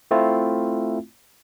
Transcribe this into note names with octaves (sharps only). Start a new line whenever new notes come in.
A3 C4 E4 F4